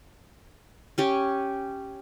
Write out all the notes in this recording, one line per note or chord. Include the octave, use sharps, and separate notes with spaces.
C#4 G4 C#5